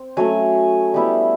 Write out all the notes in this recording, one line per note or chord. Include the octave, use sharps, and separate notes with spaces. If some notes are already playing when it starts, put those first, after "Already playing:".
Already playing: C4
F#3 A3 C#4 G#5
G3 B3 E4